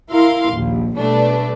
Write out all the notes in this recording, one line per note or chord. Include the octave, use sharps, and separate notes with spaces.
E4 A#4 F5 C6
A#1 D#2
B2 G3 A3 D4 B4